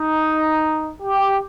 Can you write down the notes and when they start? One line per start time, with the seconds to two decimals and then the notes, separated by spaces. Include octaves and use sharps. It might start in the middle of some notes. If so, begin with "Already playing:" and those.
Already playing: D#4
1.02 G4